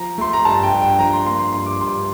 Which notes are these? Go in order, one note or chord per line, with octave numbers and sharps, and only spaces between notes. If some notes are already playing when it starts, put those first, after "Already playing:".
Already playing: F3 A#5
A3 C6
A#5
G2 A5
G5
G2
G5
F3 A#5
C6
A#3 C6
C6
G2 C6
D6
G2 C6